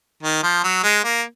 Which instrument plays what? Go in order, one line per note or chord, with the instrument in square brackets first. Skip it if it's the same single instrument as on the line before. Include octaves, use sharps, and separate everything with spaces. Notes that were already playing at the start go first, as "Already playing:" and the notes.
[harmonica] D#3
F3
F#3
G#3
A#3